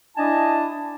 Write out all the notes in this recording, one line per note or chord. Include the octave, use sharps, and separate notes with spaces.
D4 E4 D#5 G#5 A5